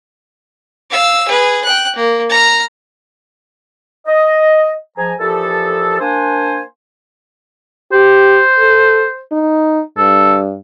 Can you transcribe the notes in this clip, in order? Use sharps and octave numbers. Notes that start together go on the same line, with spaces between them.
F5 E6
G#4 B4
G5 F#6
A#3
A#5 F6
D#5
G#2 F3 G#5 A#5
A#2 E3 F3 G4 A4
A#3 D4 C5 G#5
G4 C5
A4
D#4
G2 A4